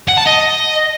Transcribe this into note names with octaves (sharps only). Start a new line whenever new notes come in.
F#5
A5
D#5